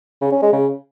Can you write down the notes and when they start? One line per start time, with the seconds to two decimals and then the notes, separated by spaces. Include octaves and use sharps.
0.21 C#3
0.32 C#4
0.42 G#3
0.53 C#3